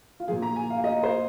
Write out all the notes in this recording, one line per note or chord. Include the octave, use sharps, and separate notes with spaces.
F4
A#2 F3 G#4
A#5
G#5
F5
D#5
C5